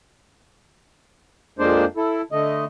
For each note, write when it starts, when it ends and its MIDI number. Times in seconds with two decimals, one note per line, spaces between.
1.59 1.85 41
1.59 1.85 56
1.59 1.85 58
1.59 1.85 62
1.59 1.85 72
1.59 1.85 74
1.97 2.22 64
1.97 2.22 69
2.32 2.64 50
2.32 2.64 57
2.32 2.64 75